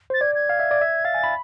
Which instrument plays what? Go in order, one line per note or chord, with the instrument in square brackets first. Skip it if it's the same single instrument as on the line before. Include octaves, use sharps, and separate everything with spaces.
[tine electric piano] C5 [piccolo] A6
[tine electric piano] D5 [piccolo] G#6
[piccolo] G#6
[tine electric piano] F5
E5
D5
E5
[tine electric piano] F5 [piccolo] A6
[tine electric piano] G#5
B5